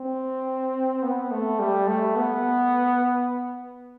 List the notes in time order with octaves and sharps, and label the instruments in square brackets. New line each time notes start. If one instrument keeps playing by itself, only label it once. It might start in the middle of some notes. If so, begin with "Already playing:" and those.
Already playing: [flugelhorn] C4
B3
A3
G3
A3
B3